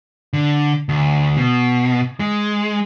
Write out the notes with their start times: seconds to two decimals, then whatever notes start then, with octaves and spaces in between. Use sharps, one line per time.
0.33 D3
0.89 D2
1.37 B2
2.20 G#3